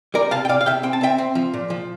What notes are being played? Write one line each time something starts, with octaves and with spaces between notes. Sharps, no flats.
G3 A#4 D5
C3 F5 A5
G5
C3 D5 F5
F5
C3 E5 G5
C4 G5
A5
C4 E5 G5
C4
F3
A#2
F3